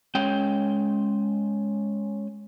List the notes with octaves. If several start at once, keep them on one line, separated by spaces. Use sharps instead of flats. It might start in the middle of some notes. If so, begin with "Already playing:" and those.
G#3 C#4 G5